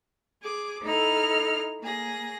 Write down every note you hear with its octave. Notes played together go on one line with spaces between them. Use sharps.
G#4 D6
D#4 E4 A4 F6
A#3 G#4 A#6